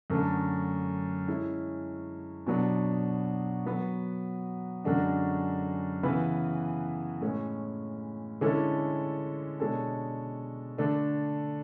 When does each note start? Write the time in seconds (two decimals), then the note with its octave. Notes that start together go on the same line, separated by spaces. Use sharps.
0.10 F#2 D3 A3
1.28 G#3 C#4 E4
2.46 B2 F#3 B3 D4
3.66 F#3 B3 F#4 B4
4.84 F#2 D3 G#3 D4 F#4
6.03 C#3 E3 B3 E4 B4
7.22 A2 G#3 C#4
8.41 D3 G#3 C#4 E4 A4
9.59 B2 G#3 D4 A4 C#5
10.78 D3 A3 D4 A4